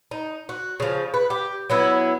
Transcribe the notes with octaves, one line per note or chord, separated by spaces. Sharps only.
D#4
F#4
C#3 F3
B4
G4
F#3 B3 E4